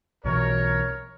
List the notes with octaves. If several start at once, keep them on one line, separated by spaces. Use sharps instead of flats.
B1 B2 E3 A#4 C#5